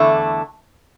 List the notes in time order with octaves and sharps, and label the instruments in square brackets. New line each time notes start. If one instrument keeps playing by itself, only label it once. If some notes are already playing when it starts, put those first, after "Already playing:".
Already playing: [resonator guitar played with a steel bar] E2 D3 A3 E4